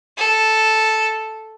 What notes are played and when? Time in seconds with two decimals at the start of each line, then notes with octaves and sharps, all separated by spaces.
0.17 A4